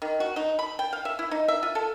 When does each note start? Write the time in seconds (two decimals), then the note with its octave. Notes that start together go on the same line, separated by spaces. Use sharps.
0.02 D#3
0.20 F#4
0.36 D#4
0.59 B5
0.79 G5
0.93 F5
1.05 E5
1.19 E4
1.31 D#4
1.48 E5
1.63 F4
1.75 A4